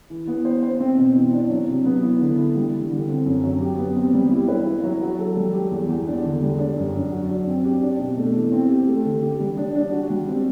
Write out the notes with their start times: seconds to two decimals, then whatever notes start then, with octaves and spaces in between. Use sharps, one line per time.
0.10 E3
0.27 B3
0.45 C5
0.63 C5
0.80 C4
0.98 B2
1.15 E3
1.33 D4
1.50 F#3
1.68 C3
1.85 B3
2.03 E4
2.20 D3
2.38 E4
2.56 G3
2.73 E3
2.91 D3
3.09 C4
3.26 F#2
3.44 F#3
3.61 G4
3.78 B3
3.96 C4
4.14 G3
4.31 E4
4.48 B4
4.66 E4
4.83 F#3
5.01 F#4
5.19 A4
5.37 G3
5.54 G4
5.71 E2
5.89 E2
6.07 D4
6.25 D3
6.42 G3
6.59 D4
6.77 F#2
6.95 F#2
7.12 F#4
7.29 D4
7.47 C4
7.65 G4
7.82 D4
7.99 B2
8.17 A3
8.35 E3
8.52 C4
8.69 G4
8.87 A3
9.05 D3
9.22 G4
9.40 G3
9.57 D4
9.75 D4
9.92 F#4
10.10 G3
10.28 C4